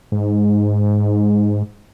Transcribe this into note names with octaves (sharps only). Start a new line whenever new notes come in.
G#2